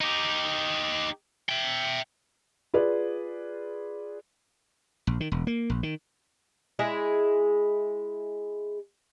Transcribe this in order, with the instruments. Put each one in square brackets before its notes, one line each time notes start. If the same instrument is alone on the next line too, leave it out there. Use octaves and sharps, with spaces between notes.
[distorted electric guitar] D#4 G4
E5 G5
[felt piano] F4 G#4 B4 D5
[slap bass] A#1
D#3
E1
A#3
A#1
D#3
[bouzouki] G#3 E4 G#4